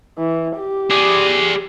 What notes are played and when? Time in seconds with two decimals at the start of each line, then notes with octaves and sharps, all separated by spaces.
0.18 E3
0.58 G4
0.90 G#4 D5